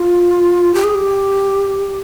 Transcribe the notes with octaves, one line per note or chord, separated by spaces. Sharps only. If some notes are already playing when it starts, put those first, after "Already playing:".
Already playing: F4
G4
G#4
G4